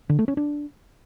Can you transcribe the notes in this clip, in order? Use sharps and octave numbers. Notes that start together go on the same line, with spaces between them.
D3
A3
C#4
D4